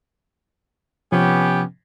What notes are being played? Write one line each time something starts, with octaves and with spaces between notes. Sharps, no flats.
C3 F3 B3 C#4 G4